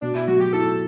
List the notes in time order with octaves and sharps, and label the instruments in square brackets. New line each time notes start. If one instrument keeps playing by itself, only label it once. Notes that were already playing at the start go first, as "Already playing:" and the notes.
[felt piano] B2 [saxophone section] D4
[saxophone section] E4
[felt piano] F#3 [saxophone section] F#4
[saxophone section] G4
[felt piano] E4 [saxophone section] A4